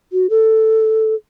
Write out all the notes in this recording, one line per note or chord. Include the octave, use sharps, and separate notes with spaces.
F#4
A4